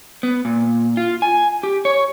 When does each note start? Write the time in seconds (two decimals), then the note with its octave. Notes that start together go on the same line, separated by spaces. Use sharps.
0.23 B3
0.45 A#2
0.97 F4
1.22 G#5
1.63 G4
1.85 C#5